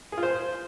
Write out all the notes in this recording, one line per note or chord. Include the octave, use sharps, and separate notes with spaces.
G#4
F4
C5